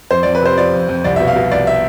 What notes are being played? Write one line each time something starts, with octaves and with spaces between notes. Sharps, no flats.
F2 C5
D5
F2
B4
C3 C5
F3 D5
F2
F2
C2 D5
E5
B2
F5
B2
C2 D5
E5